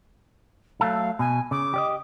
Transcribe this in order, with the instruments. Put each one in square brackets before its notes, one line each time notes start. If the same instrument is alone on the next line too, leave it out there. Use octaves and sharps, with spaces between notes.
[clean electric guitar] F#3 A3 A4 [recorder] F5
[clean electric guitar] B2 [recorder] G#5
[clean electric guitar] C#3 [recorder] D6
[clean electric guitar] G4 D5 D#5